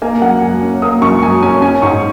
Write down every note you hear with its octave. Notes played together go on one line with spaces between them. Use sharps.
A#3 G#5
F#2 F#5
F#3 G#5
C#4
A#3 D#6
F#2 C#6
F#3 G#5
C#4 G#5
C#4 G#5
G#2 C#6